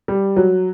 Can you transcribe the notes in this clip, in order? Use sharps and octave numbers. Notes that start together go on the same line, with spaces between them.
G3
F#3